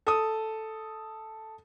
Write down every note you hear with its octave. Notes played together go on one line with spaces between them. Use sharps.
A4 D#6